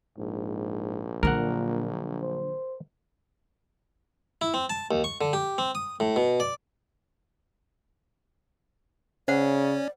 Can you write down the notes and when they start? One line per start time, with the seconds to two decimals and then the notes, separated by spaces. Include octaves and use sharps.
0.18 A#1 G#2
1.23 A#2 D3 F#3 A#4 F#5
2.22 C5
4.41 E4
4.54 C4
4.70 A5
4.91 D#2
5.04 C#6
5.21 D3
5.33 G4
5.58 C4
5.75 D#6
6.00 A2
6.16 B2
6.40 D5
9.28 C#3 C#4 C5 D5 F#5